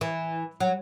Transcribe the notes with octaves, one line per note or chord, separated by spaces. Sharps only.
E3
F#3